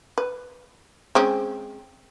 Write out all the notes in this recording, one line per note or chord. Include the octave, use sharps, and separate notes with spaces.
B4
G#3 C4 C#4